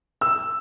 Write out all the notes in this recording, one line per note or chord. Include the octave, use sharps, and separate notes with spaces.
E6